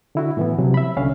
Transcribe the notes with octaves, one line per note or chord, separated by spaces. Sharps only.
D3 E4 F#4
A2 E3 B3
C3 F3 F#3
E5 B5
C2 D3 C#4 F5